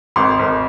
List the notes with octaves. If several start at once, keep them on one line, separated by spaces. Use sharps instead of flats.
G#1 C6
G#1